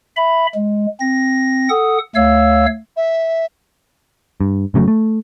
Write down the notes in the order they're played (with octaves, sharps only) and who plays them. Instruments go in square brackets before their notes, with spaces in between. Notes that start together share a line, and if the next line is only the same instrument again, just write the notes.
[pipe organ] E5 B5
G#3
C4 A#6
A4 F#5 D#6
D2 A3 C#5 F5 E6
[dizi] E5
[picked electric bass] G2
F1 C#3 F#3 A3
A3